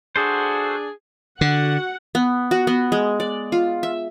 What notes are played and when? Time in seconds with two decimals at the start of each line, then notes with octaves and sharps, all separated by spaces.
0.16 D4 F#4 G#4 A4 C5
1.41 D3 F#4 F#5
2.15 B3
2.51 F#4
2.67 B3
2.92 G#3
3.20 D5
3.52 F4
3.83 E5